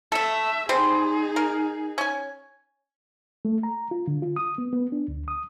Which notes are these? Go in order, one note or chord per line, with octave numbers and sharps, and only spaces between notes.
A3 A4 E5
G3 C4 D#4 G#4 C5
A#4
C#4 G#5
A3
A#5
F4
D3
F4
D#6
B3
B3
D4
D2
D#6